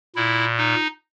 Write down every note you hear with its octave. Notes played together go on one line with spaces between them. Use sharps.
A#2 E4
D#4